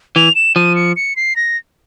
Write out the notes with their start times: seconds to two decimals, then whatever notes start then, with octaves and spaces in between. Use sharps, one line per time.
0.16 E3 F7
0.35 E7
0.56 F3 D#7
0.76 C#7
0.96 C#7
1.16 C7
1.36 A#6